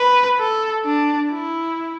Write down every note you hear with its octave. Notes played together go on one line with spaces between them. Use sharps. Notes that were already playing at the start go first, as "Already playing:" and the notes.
Already playing: B4
A4
D4
E4